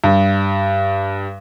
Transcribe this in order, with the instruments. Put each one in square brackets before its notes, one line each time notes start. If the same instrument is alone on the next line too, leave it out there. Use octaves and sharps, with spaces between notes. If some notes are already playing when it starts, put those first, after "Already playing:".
[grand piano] G2